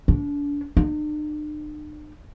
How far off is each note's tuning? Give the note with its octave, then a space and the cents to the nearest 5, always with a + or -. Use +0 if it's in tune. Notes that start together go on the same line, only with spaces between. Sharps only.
D4 -35
D4 +45